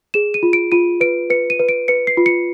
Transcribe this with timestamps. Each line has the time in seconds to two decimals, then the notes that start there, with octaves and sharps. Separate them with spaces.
0.14 G#4 E7
0.34 D#7
0.43 F4
0.53 D7
0.72 F4 D#7
1.01 B4 D7
1.30 B4 C#7
1.50 D#7
1.59 B4
1.69 D7
1.88 B4 C#7
2.07 C7
2.17 F4
2.26 C#7